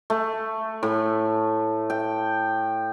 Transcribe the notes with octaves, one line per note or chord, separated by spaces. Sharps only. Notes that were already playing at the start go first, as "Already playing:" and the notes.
A3
A2
G5